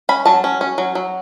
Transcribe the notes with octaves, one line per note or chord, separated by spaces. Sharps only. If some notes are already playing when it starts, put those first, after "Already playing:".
C#4 B5
F#3 A5
C#4
C#4
F#3
F#3